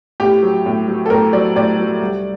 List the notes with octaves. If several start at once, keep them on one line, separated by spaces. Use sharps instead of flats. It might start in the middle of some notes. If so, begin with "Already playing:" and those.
A2 G4
F#3
A2
F#3
A4
A2 A#4
F#3 D5
A2 D5
F#3
C2